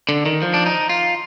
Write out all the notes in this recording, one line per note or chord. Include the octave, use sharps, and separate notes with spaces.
D3
D#3
F3
D4
D#4
F4